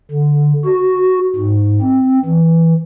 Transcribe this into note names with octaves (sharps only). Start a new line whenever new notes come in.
D3
F#4
G#2
C4
E3